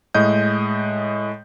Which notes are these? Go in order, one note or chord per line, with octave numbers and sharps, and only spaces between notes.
A2 G#3 D#5 G6